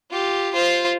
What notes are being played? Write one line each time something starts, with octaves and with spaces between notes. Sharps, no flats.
F4 G4
F4 C5